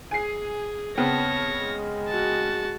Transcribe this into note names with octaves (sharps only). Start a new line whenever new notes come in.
G#4 G#5 C7
C#3 B3 C4 C#5 A5 A#6
G#3
F#4 A5